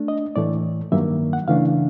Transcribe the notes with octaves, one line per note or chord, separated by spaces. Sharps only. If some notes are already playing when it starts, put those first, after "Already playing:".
Already playing: A3 D4
D#5
A2 E3 A3 D5
G2 D#3 F#3 A#3 E5
F#5
C#3 E3 A3 D4 F5